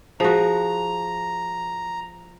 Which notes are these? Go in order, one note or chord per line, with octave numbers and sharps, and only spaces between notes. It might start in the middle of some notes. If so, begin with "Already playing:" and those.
F3 F#4 G#4 A#5